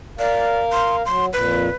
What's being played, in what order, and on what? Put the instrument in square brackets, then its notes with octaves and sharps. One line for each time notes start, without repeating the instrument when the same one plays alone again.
[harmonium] A#4 F5 [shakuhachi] D5
[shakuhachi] C6
[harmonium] F#3 [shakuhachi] C6
[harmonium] F2 A#2 [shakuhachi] B4